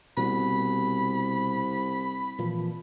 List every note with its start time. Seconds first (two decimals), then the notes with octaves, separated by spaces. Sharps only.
0.17 C2 B2 G3 B3 B5
2.39 A#2 E3 F3